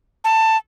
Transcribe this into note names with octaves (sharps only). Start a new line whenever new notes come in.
A5